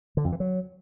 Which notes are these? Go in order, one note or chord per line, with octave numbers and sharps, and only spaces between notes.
D3
F2
E3
F#3